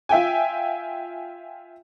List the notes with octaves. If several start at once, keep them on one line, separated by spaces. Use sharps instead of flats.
F4 E5 G5 G#5